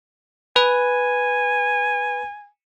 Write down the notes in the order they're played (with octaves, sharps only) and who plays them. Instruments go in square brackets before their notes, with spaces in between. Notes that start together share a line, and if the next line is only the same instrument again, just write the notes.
[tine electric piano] B4 [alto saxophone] G#5